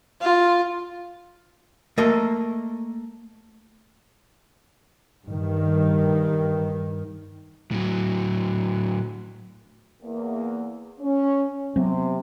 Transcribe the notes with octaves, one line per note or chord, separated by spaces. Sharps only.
F4
A3 A#3 A#4 D#5
G2 D#3
A2 F#3
E2 A#3
C#4
C3 F#3 B3 C4